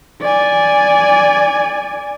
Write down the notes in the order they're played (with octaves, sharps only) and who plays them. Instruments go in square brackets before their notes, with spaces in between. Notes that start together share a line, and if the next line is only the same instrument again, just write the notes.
[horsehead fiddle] D5 G#5